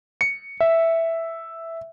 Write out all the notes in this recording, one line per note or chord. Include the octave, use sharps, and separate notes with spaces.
C#7
E5